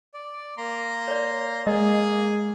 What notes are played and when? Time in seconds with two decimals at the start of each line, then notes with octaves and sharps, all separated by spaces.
0.14 D5
0.57 A#3 A#5 C6
1.08 C#5 D5
1.67 G#3 A#3 G#4 D#5